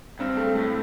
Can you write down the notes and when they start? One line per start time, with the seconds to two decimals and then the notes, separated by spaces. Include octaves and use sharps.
0.19 G2 C4
0.37 A3
0.55 A2 A3